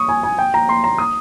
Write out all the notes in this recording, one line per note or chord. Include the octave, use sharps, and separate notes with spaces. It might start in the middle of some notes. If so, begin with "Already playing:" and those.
Already playing: C#6 D#6
G#5
G#5
G5
A#5
C6
A#5
D#6